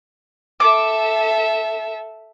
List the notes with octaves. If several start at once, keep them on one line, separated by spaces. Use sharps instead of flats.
A4 E5 D6